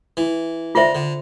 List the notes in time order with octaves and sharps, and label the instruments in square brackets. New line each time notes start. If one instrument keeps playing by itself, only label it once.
[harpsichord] E3
[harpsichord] D3 [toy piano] F4 C5 E5
[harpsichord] D3